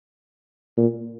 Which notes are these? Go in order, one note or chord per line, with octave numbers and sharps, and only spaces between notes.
A#2